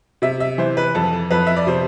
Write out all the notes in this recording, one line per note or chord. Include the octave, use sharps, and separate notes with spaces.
C3 E5
E5
E3 C5
B4
F2 A4
F2 B4
E5
D5
C3 C5